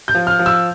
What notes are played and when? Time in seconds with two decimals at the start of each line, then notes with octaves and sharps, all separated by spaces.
0.08 G6
0.15 F3
0.27 F6
0.39 F3
0.46 E6